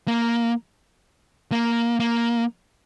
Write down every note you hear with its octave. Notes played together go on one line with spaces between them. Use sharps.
A#3
A#3
A#3